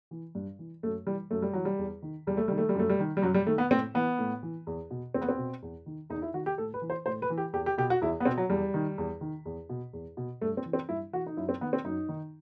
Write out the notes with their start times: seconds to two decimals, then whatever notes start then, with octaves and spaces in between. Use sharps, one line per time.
0.11 E3
0.35 G2
0.59 E3
0.83 F#2 A3
1.06 E3 G3
1.31 F#2 A3
1.42 G3
1.53 E3 F#3
1.65 G3
1.78 E2
2.03 D#3
2.27 E2 G3
2.37 A3
2.48 D#3 G3
2.58 A3
2.69 G3
2.74 F#2 A3
2.89 G3
2.99 D#3
3.17 G3
3.22 F#2 F#3
3.34 G3
3.46 D#3 A3
3.58 B3
3.71 A2 C4
3.94 E3 B3
4.19 A2
4.43 E3
4.67 E2
4.91 B2
5.14 E2 C4
5.21 B3
5.29 C4
5.38 B2
5.62 E2
5.86 D#3
6.10 E2 D#4
6.22 E4
6.33 D#3 F#4
6.46 G4
6.58 A2 A4
6.74 B4
6.82 E3
6.90 C5
7.06 A2 C5
7.22 B4
7.30 E3
7.38 G4
7.53 E2 G4
7.66 G4
7.78 B2 G4
7.90 F#4
8.02 E2 E4
8.20 B3
8.25 B2 C4
8.38 F#3
8.50 E2 G3
8.74 D#3
8.98 E2
9.21 D#3
9.45 E2
9.69 B2
9.93 E2
10.17 B2
10.41 G2 A3
10.57 C4
10.66 E3
10.73 C4
10.89 G2 E4
11.13 E3 F#4
11.27 D#4
11.37 F#2 E4
11.49 C4
11.61 D#3 B3
11.73 C4
11.85 F#2 D#4
12.09 D#3